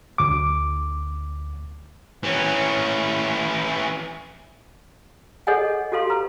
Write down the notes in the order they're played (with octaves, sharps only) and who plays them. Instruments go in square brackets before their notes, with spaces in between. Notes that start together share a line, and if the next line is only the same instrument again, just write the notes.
[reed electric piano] D2 D6
[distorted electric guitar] E3 C#4
[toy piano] G#4 A4 C#5 D#5 F#5 G#5
F#4 G4 A4 F5 C6
B4 A#5